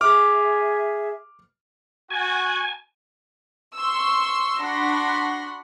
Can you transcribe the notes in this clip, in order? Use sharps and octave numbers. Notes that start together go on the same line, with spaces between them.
G#4 E5 D6 F6
F#4 G#5
C6 C#6 E6
D4 F#4 F#5 B5 C6 A#6